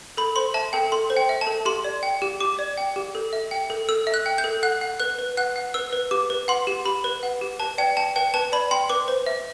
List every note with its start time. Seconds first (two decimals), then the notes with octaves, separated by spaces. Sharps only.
0.17 A4 B5
0.36 C5 C6
0.54 E5 A5
0.73 A4 G5
0.92 A4 C6
1.10 C5
1.17 G5
1.29 E5
1.41 A5
1.47 A4
1.65 G4 C6
1.84 D5
2.03 G5
2.22 G4
2.40 G4 D6
2.59 D5
2.78 G5
2.96 G4
3.15 A4
3.33 E5
3.51 G5
3.70 A4
3.89 A4 E6
4.07 E5
4.14 F#6
4.26 G5
4.38 G6
4.44 A4
4.63 F#5 F#6
4.81 F#5
5.00 B4 F#6
5.19 B4
5.37 F#5 F#6
5.56 F#5
5.74 B4 E6
5.93 B4
6.11 G4 D6
6.30 B4
6.48 F#5 C6
6.67 G4
6.85 G4 B5
7.04 B4
7.23 F#5
7.41 G4
7.59 B4 A5
7.78 D5 G5
7.97 G5 A5
8.16 B4 G5
8.34 B4 A5
8.52 D5 B5
8.71 G5 C6
8.89 B4 D6
9.08 C5
9.26 E5